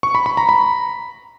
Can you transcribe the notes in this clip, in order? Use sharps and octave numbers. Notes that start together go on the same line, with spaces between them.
C#6
B5
B5
A#5
B5